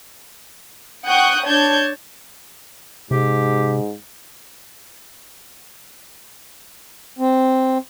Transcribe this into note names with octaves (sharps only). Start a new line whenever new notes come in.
F#5 G5 C#6 D#6 F#6 G6
D4 C#5 A5 G6 G#6
G#2 C3 G4
C4